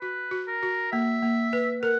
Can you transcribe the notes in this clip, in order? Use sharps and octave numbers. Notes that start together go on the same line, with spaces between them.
F#4 B4
F#4
A#4
F#4
A#3 E5
A#3
B4
A#4 F#5